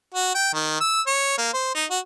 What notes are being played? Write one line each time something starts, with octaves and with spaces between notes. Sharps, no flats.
F#4
G5
D#3
E6
C#5
A#3
C5
D#4
F#4